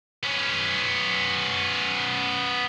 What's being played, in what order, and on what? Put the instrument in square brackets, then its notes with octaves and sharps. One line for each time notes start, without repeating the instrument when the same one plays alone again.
[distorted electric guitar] B3 C#4